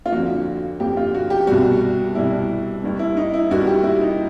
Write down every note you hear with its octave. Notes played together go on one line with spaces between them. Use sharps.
F4
F2 D3 F3 F#4
F2 D3 F3 G4
F4
F#4
G4
C2 B2 G3 F#4
C2 B2 G3 E4
D#2 D#3 G3
E4
D#4
E4
D#2 D#3 G3 F#4
G4
E4
D#4